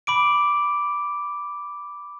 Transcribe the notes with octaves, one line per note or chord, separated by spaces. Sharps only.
B5 D6 D7